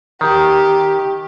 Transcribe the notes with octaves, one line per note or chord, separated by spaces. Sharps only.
D#3 G4